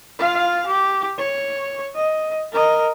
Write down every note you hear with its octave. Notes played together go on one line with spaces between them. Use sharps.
F4 F5
G4
C#5
D#5
A#4 D#5